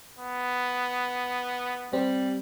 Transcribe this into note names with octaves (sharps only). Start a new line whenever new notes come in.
B3
G3 C4